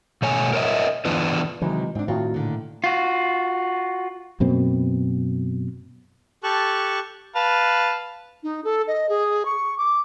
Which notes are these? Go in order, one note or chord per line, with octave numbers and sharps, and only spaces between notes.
B2 A3 C#5 G#5
A#4 C#5 D#5 E5
E3 B3 D4 F4 B4
C3 D#3 E3 F#3 G#3
G#2 C4 D4
A2 D#3 C4 F4 F#4
A#2 D3
F4 F#4
F#2 B2 A#3 C4
G4 A4 A5 C#6 F#6
B4 F5 A5
D#4
A4
D#5
G#4
C#6
D6